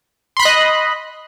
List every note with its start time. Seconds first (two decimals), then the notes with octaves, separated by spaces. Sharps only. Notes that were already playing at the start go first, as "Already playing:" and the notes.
0.37 C6
0.39 B5
0.42 F#6
0.45 D#5